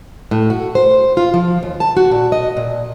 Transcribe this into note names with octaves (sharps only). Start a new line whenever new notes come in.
A2
F#4
C5
F4
F3
D#2
A5
F#4
A#2
D#5
A#2